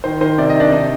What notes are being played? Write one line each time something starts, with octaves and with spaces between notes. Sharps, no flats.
D#3 C5
D#3 C5
C3 D5
D#5
D#3
D4 D5
C3 D#4 D#5